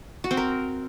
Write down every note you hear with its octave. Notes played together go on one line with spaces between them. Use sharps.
F#4
C4
A#4